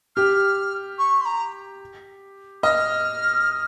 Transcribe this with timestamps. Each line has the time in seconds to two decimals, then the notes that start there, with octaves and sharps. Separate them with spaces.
0.16 G4 F6
0.98 C#6
1.21 C6
1.25 A#5
2.63 D#5 F6